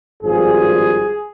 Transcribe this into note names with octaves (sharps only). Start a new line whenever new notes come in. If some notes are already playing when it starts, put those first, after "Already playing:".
G#1 G2 F3 G#4